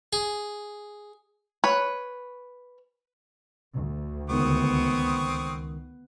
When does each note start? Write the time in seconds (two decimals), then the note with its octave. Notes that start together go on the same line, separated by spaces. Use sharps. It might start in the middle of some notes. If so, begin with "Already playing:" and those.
0.13 G#4
1.64 B4 C#5
3.74 D2
4.30 C#2 D#3 B3 C4 C#6 D#6